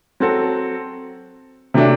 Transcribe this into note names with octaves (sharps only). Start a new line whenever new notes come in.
F#3 C4 F#4 A4
C3 F#3 A3 D4